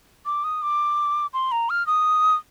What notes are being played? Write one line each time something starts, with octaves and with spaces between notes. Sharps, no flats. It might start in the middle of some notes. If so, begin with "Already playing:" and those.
D6
D#6
D6
C6
A#5
F6
D#6